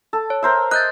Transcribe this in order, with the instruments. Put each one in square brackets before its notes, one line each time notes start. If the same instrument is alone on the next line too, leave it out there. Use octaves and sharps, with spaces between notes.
[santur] A4
[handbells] C#5
[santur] A#4 C5 E5
[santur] D#5 [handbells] F#6 G6 A6